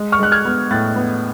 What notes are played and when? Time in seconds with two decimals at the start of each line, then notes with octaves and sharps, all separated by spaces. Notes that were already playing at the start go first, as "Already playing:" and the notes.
Already playing: G#3
0.12 C#6 F6
0.19 G#3 F#6
0.32 F6 G#6
0.45 B3
0.71 A2 F#6 A6
0.96 B3